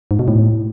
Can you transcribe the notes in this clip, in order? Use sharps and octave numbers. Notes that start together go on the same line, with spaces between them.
G#2
B2
A2